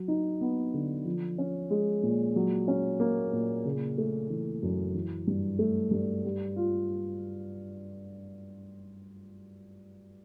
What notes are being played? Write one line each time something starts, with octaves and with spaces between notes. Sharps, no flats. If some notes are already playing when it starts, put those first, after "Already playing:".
Already playing: F#3
D#4
B3
D3
F3
C#4
G#3
A#2
F#3
C#4
A#3
A#2
C#3
A3
E3
F#2
E3
G2
A3
G2
G3
F4